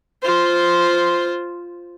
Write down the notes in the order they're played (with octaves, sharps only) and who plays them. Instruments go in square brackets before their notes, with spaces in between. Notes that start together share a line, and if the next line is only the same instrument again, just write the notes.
[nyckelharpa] F4 C5